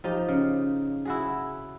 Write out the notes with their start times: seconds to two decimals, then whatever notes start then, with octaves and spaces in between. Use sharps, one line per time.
0.04 F3 D#4 G4
0.28 C#3
1.05 E4 F#4 G#4